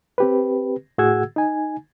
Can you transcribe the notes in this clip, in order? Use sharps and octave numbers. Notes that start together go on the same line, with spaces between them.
C4 G4 B4
A2 F#4 G#4 F#5 E6 G#6
D#4 G#5